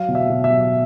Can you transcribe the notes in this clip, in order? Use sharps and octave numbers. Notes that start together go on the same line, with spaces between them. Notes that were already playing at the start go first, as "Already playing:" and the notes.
Already playing: F#3 F5
B2
E5
B2
E5
F#3